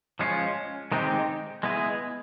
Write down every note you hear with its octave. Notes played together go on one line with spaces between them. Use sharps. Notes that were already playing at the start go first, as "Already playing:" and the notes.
F3 G#3 C#4 F4
D#3 G#3 C4 D#4 G4
G#3 B3 E4 G#4